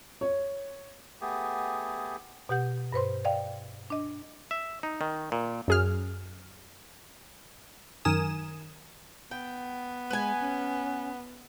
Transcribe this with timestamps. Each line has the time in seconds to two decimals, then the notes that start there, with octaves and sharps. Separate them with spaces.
0.21 C#5
1.21 A3 B3 G4 G#4
2.49 B2 G4 F#5 G6
2.92 G2 B4 C5 C6
3.25 D5 D#5 F5 G5
3.90 D4 D#5
4.51 E5
4.83 D#4
5.01 D#3
5.32 A#2
5.68 F#2 G#4 F6
8.05 F#2 D#3 A#4 G#5 D#6 E7
9.31 B3 G5
10.10 G#3 B4 G#5
10.40 C#4